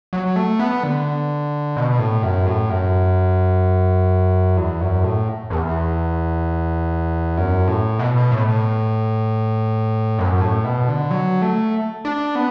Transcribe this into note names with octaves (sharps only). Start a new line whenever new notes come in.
F#3
A3
B3
D3
B2
A2
F#2
A2
F#2
E2
F#2
A2
E2
F#2
A2
B2
A2
F#2
A2
B2
D3
F#3
A3
D4
B3